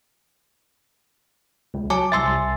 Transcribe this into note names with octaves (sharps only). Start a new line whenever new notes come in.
C#2
F#3 G#5 A5 D6
C2 E5 G#5 C6 E6 A6